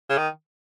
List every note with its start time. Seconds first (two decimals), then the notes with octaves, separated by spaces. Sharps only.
0.09 C#3
0.18 D#3